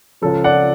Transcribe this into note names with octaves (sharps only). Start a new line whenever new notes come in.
C#2 C#3 F3 A4
D5 F#5